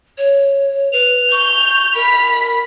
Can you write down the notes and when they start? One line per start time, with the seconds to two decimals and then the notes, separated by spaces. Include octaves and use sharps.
0.18 C#5
0.92 B4 F7
1.32 C#6 G6
1.95 A#4 B5